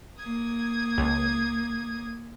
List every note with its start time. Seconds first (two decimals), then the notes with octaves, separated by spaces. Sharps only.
0.18 A#3 D#6 G#6
0.98 C#2